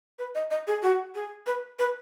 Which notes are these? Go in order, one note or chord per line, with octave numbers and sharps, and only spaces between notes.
B4
D#5
D#5
G#4
F#4
G#4
B4
B4